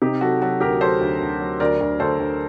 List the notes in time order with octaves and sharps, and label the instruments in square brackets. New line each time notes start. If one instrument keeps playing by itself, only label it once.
[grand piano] C3 D#4 G4
F#3 F#4 A4
F#3 F#4 A4
D2 G4 A#4
F#3 A4 C5
D2
D2
F#3
D2 A#4 D5
D2
D2 A4 C5
D2